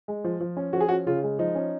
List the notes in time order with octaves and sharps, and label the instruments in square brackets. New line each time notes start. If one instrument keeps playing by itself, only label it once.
[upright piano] G#3
F3
F3
C#4
F3 F#4
G#4
C#4 F#4
C#3 F4
G#3
F3 D#4
C#4